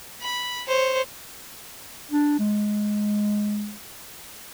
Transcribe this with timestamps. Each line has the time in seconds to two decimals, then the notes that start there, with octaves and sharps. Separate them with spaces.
0.21 B5
0.68 C5 C#5
2.11 D4
2.39 G#3